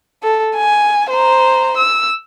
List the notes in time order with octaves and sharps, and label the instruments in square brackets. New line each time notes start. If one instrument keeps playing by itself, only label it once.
[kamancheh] A4
G#5
C5 A#5
E6